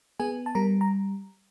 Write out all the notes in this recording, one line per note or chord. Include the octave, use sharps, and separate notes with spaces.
B3 G#4 G#5
A5
G3 A#4 A#5
A#5